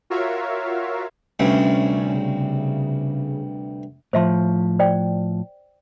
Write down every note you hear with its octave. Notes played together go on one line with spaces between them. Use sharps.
F4 F#4 A#4 C#5 E5 F5
D2 G2 C3 C#4
C#3
A2 F3 C5 E5 C6
C5 D5 G5